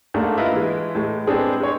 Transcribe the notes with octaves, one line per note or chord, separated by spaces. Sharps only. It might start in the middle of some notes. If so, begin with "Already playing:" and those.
G#2 A3 A#3 D4
E4 F4 B4 D#5
E3 G#3
A2 G#3
G#3 B3 C4 D4 G#4
G#3 C#5